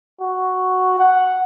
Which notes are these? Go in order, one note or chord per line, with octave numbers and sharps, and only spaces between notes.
F#4
F#5